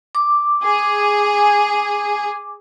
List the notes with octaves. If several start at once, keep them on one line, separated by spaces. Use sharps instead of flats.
D6
G#4